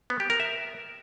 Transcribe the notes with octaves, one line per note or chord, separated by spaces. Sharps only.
B3
G4
A#4
E5